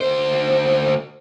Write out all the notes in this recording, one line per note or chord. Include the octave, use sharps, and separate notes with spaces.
D2 C5